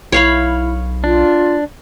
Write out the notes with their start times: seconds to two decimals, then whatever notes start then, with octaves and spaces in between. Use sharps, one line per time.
0.12 B1 E4 C#5 F5 B5
1.04 D4 F4